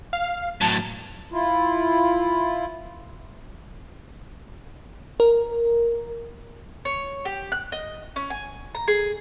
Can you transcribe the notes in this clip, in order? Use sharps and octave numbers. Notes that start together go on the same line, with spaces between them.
F5
A2 F#3 A5
E4 F4
A#4
C#5
G4
F#6
D#5
C#4
G#5
A#5
G#4